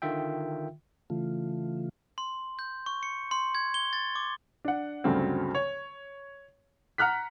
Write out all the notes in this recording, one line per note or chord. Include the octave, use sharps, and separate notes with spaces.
D3 D#3 F4 E5 G5
C#3 E3 A3 F4
C6
G6
C#6
C#7
C6
G#6
G7
A6
D6
D4 F#5
D2 G2 C#3 F#3 A3 C4
C#5
F#5 A#5 F6 F#6 B6